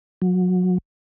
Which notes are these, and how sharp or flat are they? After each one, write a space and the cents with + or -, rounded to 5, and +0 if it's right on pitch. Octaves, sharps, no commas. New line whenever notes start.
F#3 -25